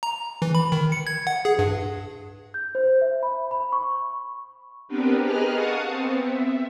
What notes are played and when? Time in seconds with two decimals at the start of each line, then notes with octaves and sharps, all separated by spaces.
0.03 A#5
0.42 E3
0.55 B5
0.72 D#3
0.92 C#7
1.07 G#6
1.27 F#5
1.45 G#4
1.59 G2
2.54 G6
2.75 C5
3.01 E5
3.23 B5
3.51 B5
3.72 C#6
4.88 B3 C4 D4 G4 A#4 B4
5.21 G#4 A#4 B4 D#5 F6 F#6
5.52 F5 F#5 A5 C#6 D#6
5.87 B3 C4
6.20 E5